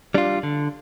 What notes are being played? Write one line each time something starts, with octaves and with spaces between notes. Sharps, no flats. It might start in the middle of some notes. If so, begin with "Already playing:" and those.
G3 D4 F4
D3